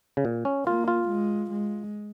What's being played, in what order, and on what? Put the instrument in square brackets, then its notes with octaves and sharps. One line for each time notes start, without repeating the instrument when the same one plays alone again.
[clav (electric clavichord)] C#3
A#2
C#4
[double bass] A#3 [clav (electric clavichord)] F4
[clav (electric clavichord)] F4
[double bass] G#3
G#3